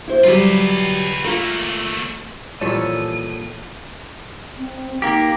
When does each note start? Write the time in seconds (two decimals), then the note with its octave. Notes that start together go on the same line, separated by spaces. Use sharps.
0.08 E4 C5
0.24 F#3 G3 F4 B4
1.25 A3 A#3 F4 A#4
2.61 A#2 E3 F3 G3 A4 C#5 D#7
4.57 C4
5.02 A#3 D#4 G4